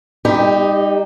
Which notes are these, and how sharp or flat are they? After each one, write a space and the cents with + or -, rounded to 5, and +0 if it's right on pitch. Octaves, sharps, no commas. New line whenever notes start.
G3 +35 D#4 +0 G4 +5